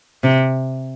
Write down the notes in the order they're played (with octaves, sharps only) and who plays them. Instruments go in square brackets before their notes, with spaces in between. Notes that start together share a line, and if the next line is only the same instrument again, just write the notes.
[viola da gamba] C3